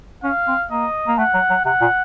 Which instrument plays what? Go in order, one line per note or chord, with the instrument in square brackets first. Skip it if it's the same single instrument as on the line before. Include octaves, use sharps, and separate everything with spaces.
[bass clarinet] C#4 [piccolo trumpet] F5
[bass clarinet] C4
[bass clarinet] A#3 [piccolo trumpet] D#5
[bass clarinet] A#3
[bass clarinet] A3 [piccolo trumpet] F#5
[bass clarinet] F#3
F#3
[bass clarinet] C3 [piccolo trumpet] F#5
[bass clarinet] A#2